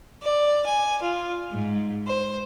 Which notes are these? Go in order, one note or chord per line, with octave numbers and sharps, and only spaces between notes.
D5
G#5
F4
G#2
C5